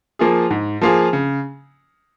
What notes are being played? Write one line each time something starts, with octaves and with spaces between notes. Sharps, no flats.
F3 A#3 F4 G#4
G#2
F3 A#3 F4 G#4
C#3